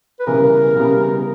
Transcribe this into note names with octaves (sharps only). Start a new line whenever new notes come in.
B4
C#3 E3 G3 B3 A#4
C#3 E3 G3 B3